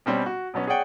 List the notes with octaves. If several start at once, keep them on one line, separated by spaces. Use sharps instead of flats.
B2 G3 C4 C#4
F#4
B2 F#3 B3 C#4
G#4 C#5 D5 F#5 G5